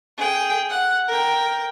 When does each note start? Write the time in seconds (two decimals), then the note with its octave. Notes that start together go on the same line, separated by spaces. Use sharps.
0.18 G#4 G5
0.70 F#5
1.08 A#4 G5